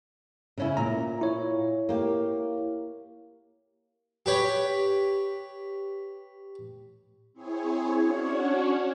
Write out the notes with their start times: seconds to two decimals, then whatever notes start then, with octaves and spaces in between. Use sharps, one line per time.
0.58 C#3 C#4 E4
0.77 A#2 A#5
1.21 E4 C#5
1.89 A#3 G4
4.26 G4 B4 C#5
7.33 C4 E4 G#4 C#5
7.96 C#4 D4 F#4 C#5